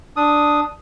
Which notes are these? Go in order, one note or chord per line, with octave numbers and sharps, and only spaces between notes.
D4 D#6